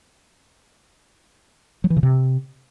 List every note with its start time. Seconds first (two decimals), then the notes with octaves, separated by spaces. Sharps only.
1.84 F#3
1.90 E3
1.97 C#3
2.03 C3